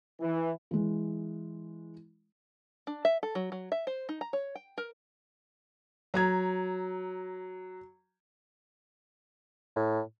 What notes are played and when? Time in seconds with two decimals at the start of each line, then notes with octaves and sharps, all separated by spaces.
0.21 E3
0.71 E3 G#3
2.87 D4
3.05 E5
3.23 A4
3.35 F#3
3.52 F#3
3.72 E5
3.87 C5
4.09 D#4
4.21 A#5
4.33 C#5
4.55 G5
4.78 A#4
6.14 F#3 A#5 G#6
9.76 A2